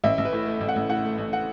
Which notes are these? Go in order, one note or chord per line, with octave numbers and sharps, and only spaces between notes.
A1 E5
A1
B4
A2
A3
A1
F#5
A1
A2 F#5
A3
A1
F#5